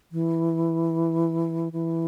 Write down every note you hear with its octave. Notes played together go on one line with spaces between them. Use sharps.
E3
E3